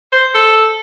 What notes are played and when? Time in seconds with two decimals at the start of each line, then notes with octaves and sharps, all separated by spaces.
0.12 C5
0.34 A4